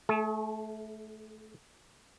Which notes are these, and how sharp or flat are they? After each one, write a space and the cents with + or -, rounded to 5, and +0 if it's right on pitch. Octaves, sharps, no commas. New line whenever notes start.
A3 -15 G#4 +45